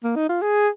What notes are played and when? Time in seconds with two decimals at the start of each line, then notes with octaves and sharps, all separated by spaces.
0.04 A#3
0.16 D#4
0.29 F4
0.42 G#4